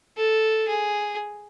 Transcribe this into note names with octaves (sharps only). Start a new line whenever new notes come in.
A4
G#4